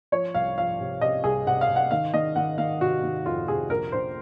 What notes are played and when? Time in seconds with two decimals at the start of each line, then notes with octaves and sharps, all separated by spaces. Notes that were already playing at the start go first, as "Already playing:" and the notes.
0.12 F3 C#5
0.34 C2 F5
0.58 F3 F5
0.80 C3
1.01 C3 D#5
1.24 C2 G#4
1.46 C3 F#5
1.61 F5
1.69 C3
1.76 F#5
1.91 D#3 F5
2.14 D#3 D#5
2.36 D#3 F#5
2.58 D#3 F5
2.81 C3 F#4
3.03 D#3
3.26 F2 F4
3.48 C3 G#4
3.70 A#1 A#4
3.92 A#1 C5